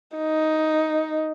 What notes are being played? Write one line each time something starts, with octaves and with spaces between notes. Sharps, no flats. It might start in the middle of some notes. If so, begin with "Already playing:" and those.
D#4